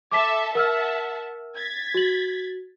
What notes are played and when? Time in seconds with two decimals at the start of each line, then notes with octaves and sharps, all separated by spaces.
0.12 A4 E5 A5 D6 B6
0.55 A#4 E5 F#5 A5 E6 F6
1.56 G#6 A6 B6
1.94 F#4 F#7